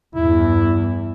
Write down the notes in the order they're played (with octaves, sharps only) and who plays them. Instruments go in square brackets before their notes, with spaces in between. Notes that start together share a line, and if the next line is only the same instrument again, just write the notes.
[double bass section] E2 G2 [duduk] E4